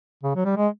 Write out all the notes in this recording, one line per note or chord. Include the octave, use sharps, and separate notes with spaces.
C#3
F#3
G3
G#3